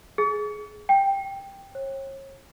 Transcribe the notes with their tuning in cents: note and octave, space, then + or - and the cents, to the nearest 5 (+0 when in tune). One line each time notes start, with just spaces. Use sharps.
G#4 +20
G5 +5
C#5 -35